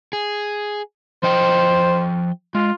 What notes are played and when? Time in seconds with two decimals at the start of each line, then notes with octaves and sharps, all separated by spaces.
0.13 G#4
1.23 F3 C5 D#5 G5
2.55 G#3 F4